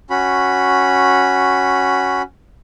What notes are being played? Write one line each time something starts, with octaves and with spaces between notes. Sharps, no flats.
C#4 F#4 B5